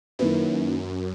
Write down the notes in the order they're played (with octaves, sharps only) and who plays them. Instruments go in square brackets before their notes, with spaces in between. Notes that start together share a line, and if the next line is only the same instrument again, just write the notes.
[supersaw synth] F#2 [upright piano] D#3 A#3 E4 B4